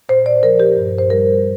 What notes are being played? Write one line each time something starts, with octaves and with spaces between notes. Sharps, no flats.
A#2 C5
D5
F3 A#4
G4
G2
C5
G3 A#4